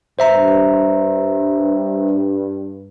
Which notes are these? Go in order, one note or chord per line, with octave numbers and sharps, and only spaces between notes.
G2 C5 E5 A#5